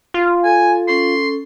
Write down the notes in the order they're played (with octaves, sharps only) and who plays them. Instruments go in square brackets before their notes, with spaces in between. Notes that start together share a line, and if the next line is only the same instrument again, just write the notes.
[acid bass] F4
[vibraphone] A4 [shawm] G#5
[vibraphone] C#4 A4 [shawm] C6